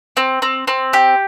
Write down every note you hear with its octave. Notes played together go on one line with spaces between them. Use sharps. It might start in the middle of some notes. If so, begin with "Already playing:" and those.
C4
C4
C4
G4